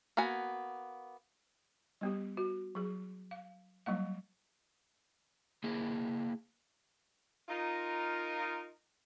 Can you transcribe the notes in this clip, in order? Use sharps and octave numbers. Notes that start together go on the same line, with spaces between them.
A#3 B3 F#4 G#5
G3 B3 G4
F#4
F#3 G#4
F5
F#3 G3 A#3 F5
A#3 E4 G#4
D#4 F4 A#4